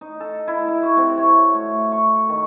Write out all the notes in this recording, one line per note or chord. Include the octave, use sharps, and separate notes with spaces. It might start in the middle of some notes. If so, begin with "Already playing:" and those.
D#4
A4
E4
E4
F#4
C3
C#5
A3
C#6
D#3